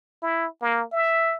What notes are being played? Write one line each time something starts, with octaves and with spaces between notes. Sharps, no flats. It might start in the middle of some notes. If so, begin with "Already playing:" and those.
E4
A#3
E5